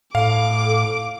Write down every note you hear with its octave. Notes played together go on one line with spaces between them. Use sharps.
A2 A4 F5 D6